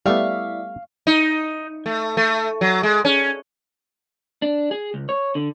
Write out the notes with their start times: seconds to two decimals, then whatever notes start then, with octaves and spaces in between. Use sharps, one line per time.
0.06 G3 A3 B3 E4 D5 E5 F5 C#6
1.07 D#4
1.86 A3
2.17 A3
2.61 F#3
2.83 G#3
3.05 C#4
4.42 D4
4.71 G#4
4.94 C#2
5.09 C#5
5.35 D3